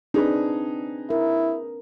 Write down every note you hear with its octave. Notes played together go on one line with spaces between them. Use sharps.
C4 D4 D#4 G#4 B4
E4 A#4